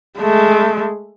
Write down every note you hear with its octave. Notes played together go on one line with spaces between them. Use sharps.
G#3 A3